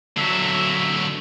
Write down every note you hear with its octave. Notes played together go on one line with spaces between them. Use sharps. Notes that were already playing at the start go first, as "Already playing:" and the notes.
D3 F#3 E5